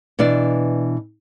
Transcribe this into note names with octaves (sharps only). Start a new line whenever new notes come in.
B2 E3 D4 D5